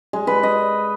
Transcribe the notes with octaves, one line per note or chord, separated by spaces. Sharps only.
G#3
B4
D#5